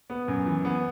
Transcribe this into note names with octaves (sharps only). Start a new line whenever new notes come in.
B3
F#2
E3
B3